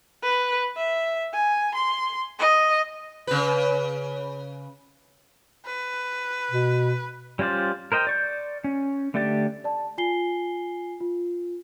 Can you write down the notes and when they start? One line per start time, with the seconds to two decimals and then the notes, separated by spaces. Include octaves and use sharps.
0.23 B4
0.77 E5
1.33 G#5
1.75 C6
2.40 D#5
3.27 C#3 B4
5.66 B4
6.51 B2
7.39 G3 C#4 F4 C5 D5
7.92 A#4 C5 D#5 G5
8.07 D5 C#6 G6
8.64 C#4
9.14 D3 A3 D4 G4 D5
9.64 D5 A5
9.98 F4 G#5 C7 G7
11.00 F4